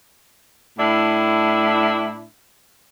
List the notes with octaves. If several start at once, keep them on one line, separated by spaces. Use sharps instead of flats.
A2 D4 E4